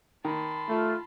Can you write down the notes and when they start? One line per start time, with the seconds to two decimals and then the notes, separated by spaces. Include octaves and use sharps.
0.25 D#3 A5 B5 C6
0.69 A3 F4